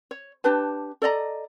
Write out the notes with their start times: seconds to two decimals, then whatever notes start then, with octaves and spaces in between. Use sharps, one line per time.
0.11 C#5
0.44 D4 G4 B4 A5
1.02 A4 D5 D#5 A#5